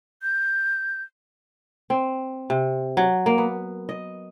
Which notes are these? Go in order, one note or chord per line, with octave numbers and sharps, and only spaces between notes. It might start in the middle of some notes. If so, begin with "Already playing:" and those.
G6
C4
C3
F#3
A#3
B3
D#5